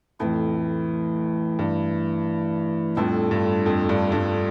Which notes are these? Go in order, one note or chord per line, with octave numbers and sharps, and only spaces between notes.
F2 A2 E3 A3 E4
G2
F2 A2 G3 D4 F4 A4
G2
F2
G2
G2